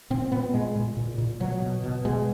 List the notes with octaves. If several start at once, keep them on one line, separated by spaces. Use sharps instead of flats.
A#2 C4
A#2 B3
A#2 G#3
A#2
A#2
A#2
B2 F#3
B2
B2
B2 G#3